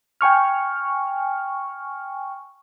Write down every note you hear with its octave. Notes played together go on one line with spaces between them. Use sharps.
G5 G#5 C#6 F6